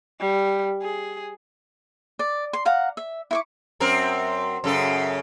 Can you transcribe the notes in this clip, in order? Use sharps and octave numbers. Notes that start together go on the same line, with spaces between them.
G3
G#4
D5
C6
F5 F#5 A#5
E5
E4 C#6 D6
F#2 C4 A#4
F#2 C#3 A4